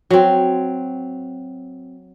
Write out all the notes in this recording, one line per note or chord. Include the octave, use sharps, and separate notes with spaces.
F#3 C4